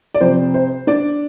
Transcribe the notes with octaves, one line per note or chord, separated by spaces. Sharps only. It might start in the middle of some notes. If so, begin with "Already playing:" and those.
D5
F2 C3 F3 C5
C5
D4 D5